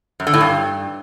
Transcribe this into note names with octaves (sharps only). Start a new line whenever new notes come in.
F#2
D3
A2
G2